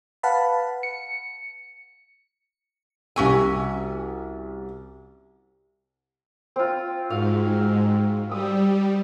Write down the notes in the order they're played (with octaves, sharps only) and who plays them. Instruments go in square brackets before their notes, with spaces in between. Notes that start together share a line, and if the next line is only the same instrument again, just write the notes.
[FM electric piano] B4 F5 F#5 A5 B5
C#7
[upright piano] C2 G4 E6 [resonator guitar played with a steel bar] C#4 F#4 G#5
[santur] C4 F4
[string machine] G#2 [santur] F#4 F5 F#5
[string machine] G3 [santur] D#6 E6